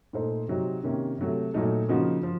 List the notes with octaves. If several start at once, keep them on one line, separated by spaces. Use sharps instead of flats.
A#2 A3 D#4 A4 C5
C3 F#3 C4 D#4 F#4
C3 D#3 A#3 C#4
C3 F#3 A3
A#2 F#3 A3 D#4 A4
C#3 F3 A#3 D#4 F#4
F3